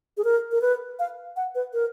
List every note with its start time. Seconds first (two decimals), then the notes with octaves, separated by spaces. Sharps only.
0.17 G#4
0.24 A#4
0.52 A#4
0.61 B4
0.99 F5
1.36 F#5
1.55 B4
1.73 A#4